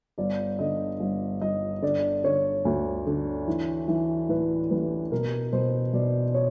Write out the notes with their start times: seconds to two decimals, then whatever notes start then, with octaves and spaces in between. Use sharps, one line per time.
0.18 G1 D5
0.59 D3 D#5
1.00 G1
1.41 G1 D#5
1.82 D3 D5
2.24 D3 C#5
2.65 D2
3.07 D3
3.48 E3
3.88 E3
4.29 A2 B4
4.71 A1 B4
5.12 B2 A#4
5.53 B2 C5
5.93 B2 D5
6.34 C#5